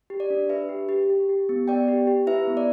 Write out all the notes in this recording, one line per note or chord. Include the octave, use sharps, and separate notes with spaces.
G4
D5
D4
D4 B4 E5
G4
G4
G4
G4
B3
B3 D5 G5
G4
G4
E4 B4 E5
B3
D5